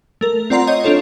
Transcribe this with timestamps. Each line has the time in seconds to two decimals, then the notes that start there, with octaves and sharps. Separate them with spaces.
0.21 A3 A#4
0.50 C4 F4 D5 F#5 A#5 C6
0.67 C#5 D#5 G6
0.83 C4 D4 F4 A4 C#5